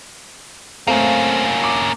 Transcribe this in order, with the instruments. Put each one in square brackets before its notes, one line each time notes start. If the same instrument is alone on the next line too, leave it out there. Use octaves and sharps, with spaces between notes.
[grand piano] A3 C4 F5 [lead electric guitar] A#3 C#4
[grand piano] D6